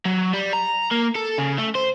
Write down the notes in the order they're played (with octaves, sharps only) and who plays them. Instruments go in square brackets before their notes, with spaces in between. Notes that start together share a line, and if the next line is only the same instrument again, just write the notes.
[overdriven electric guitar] F#3
G3
A#5
A#3
A4
C#3
A3
C5